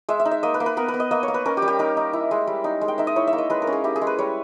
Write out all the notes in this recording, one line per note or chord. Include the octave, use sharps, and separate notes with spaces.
G#3 E5
E5
D#4
E5
A#3 D#5
B4
A#3
B4
B3 A#4
B4
B3
D#5
A#3 D#5
C#5
A#3
B4
C#4 A#4
G4
G3
G4
D#4 A#4
D#4
E4
G#3
G3
D#4
G#3
G5
D#4 E5
D#5
E4 C#5
E5
A#3
D#5
G#3 B4
A#4
C#4
G#4
E4 G4
G#4
G#3
B4
G3 C#5